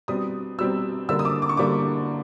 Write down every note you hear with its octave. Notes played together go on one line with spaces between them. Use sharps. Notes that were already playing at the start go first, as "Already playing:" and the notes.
B2 G3 C4 D#6
B2 G3 C4 E6
D3 G3 A#3 E6
D#6
D6
D6
C#6
D3 G3 A#3 D6